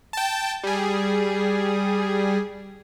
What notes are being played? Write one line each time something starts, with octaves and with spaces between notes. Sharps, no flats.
G5 A5
G3 G#4